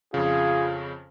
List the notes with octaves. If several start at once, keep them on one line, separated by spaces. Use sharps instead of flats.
F2 C#3 F4 G#4